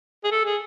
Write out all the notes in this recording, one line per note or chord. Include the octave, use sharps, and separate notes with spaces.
G#4
A4
G#4